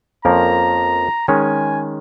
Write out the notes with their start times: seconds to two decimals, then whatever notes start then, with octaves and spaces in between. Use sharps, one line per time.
0.25 F2 F3 A#3 C#4 A#4 A#5
1.28 D#3 G#3 C#4 G#5